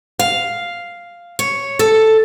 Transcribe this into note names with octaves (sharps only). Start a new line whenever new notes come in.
F5
C#5
A4